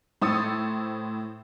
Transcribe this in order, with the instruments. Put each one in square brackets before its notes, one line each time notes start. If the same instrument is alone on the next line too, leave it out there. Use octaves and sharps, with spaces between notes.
[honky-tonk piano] A2 C5 D#6 E6 A6 C#7